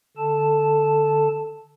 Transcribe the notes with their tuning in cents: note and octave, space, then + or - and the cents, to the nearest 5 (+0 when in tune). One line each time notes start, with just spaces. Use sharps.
D3 +0 A4 +0 A5 +0